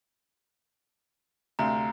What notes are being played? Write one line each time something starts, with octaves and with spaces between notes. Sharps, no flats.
D2 C3 F5 A#5